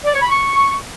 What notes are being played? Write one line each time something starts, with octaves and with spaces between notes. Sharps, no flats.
D5
C#5
B5
C#6